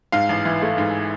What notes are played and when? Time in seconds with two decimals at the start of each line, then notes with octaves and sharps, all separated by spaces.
0.12 G#2 F5
0.29 A1
0.45 E3
0.62 A3
0.78 G#2